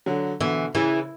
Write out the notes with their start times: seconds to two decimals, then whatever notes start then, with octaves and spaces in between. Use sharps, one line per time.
0.06 D3 F#3
0.41 B2 D3 E3
0.75 C#3 E3